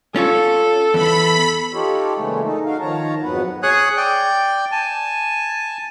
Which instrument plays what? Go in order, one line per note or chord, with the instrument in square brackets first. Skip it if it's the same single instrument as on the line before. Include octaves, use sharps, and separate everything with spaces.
[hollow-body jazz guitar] C#4 F4 C#5 [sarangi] A4
[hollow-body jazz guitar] E2 [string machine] B5
[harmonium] D#4 F4 G4 A4 C#5
A#2 C#3 E3 G#3 A3
D#4 A4
D#4 F#4 A#4 F5
D#3 F3 C#5 A5 A#5
F2 G#2 F#3 B3 B4 F#5
[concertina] G#4 C#5 D#6 F#6
D5 G5
G#5 A5